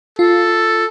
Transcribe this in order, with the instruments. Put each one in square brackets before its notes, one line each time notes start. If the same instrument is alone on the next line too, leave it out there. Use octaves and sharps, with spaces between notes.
[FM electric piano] F4 [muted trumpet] A4